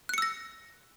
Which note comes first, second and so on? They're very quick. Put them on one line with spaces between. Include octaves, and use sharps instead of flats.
F#6 C#7 E6 A#6